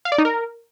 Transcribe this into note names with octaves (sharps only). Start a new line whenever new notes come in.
F5
D5
D#4
A#4